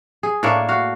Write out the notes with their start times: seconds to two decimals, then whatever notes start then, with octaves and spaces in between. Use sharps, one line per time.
0.23 G#4
0.43 A2 A#3 D4 C#5
0.69 F#4 F5